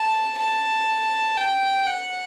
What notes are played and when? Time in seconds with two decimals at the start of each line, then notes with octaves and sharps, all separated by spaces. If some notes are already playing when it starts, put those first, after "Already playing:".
Already playing: A5
0.38 A5
1.37 G5
1.86 F#5